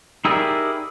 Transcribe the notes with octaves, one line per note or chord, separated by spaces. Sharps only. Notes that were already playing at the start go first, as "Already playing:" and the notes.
D#4 E4 G4 G#4 A#4 D5